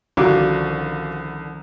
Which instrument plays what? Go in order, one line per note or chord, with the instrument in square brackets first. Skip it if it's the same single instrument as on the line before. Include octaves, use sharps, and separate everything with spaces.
[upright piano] C2 D3 D6 [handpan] D#3 F3 C#4 [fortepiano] F4 F#4